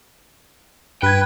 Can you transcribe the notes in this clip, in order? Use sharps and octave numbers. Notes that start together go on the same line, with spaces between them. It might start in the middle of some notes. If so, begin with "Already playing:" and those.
G2 B4 G5 G#6